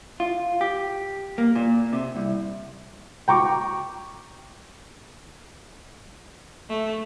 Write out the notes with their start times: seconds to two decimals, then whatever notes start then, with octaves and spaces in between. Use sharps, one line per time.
0.20 F4
0.61 G4
1.38 A#3
1.56 A#2
1.93 C3
2.16 C2
3.28 G5 A#5 C#6 D6
6.69 A3